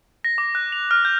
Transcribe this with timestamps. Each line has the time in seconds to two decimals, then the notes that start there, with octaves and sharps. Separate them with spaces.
0.24 A#6
0.38 D6
0.55 F#6
0.72 F7
0.91 F6
1.05 G6